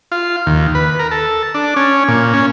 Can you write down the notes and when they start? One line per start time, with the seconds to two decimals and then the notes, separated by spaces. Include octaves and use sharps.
0.12 F4
0.46 D#2
0.75 B4
0.99 A#4
1.11 A4
1.55 D4
1.76 C#4
2.08 A#2
2.34 C#4